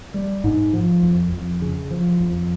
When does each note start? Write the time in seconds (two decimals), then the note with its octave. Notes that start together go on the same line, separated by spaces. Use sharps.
0.14 G3
0.44 G#2
0.73 F3
1.03 F2
1.32 F2
1.61 C#3
1.91 F3
2.20 F2